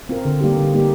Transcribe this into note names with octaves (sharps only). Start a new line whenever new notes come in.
C4 F4 A#4
D3
G3 A#3 D#4 G4
D3
G3 A#3 D#4 G4